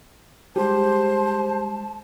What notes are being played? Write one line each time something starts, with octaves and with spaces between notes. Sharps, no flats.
G3 G#3 G4 C5 A5